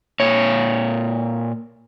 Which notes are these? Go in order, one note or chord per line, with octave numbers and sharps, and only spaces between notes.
A#2 C#5